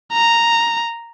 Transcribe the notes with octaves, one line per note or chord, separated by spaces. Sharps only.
A#5